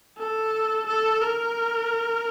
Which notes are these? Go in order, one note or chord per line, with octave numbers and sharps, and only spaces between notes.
A4
A4
A#4